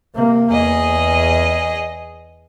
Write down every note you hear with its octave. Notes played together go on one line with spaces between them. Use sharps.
C3 A#3
E2 G#4 D#5